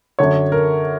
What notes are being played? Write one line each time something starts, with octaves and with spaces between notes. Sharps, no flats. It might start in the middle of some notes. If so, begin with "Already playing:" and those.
F#2 D3 C#5
A#4